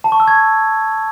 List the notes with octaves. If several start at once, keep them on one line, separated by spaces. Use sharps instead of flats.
A5
C#6
E6
G#6